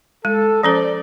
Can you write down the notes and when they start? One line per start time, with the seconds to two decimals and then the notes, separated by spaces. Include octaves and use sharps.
0.25 G#3 A4
0.63 F3 C#4 A4 C5 D5